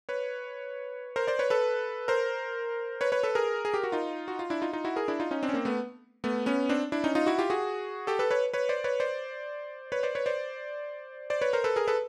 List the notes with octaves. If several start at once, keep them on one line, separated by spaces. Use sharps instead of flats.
B4 C#5
A#4 C5
C5 D5
B4 C#5
A4 B4
A#4 C5
B4 C#5
B4 C#5
A4 B4
G#4 A#4
G#4
G4
F#4
D#4 F4
F#4
F4
D4 E4
D#4 F4
D#4 F4
E4 F#4
G#4 A#4
D4 E4
D#4 F4
C#4 D#4
C4 D4
C#4
A#3 C4
A3 B3
A3 B3
B3 C#4
C4 D4
D4 E4
C#4 D#4
D#4 F4
E4 F#4
F4 G4
F#4 G#4
G4 A4
A4 B4
B4 C#5
B4 C#5
C5 D5
B4 C#5
C5 D5
B4 C#5
C5 D5
B4 C#5
C5 D5
C5 D5
B4 C#5
A#4 C5
A4 B4
G#4 A#4
A4 B4